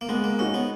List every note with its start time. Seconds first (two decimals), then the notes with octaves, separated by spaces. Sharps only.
0.01 A#3
0.09 G#3 B3
0.24 A#3
0.39 C#4 D#4 F#4
0.54 B3